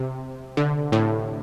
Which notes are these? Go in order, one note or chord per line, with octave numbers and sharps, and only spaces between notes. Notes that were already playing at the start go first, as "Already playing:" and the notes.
Already playing: C3
D3
A2